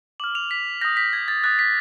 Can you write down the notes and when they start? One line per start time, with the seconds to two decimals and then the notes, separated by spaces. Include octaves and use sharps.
0.20 D6 F6 F#7
0.35 F7
0.51 B6
0.81 D#6 G6 A#6
0.97 B6
1.13 G#6
1.28 A6
1.44 D#6 F#6 A6
1.59 B6